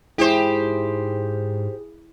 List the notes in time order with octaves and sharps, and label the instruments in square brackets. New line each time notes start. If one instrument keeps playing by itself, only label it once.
[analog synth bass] G#2 [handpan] E4 [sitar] G4 C5 [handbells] G#4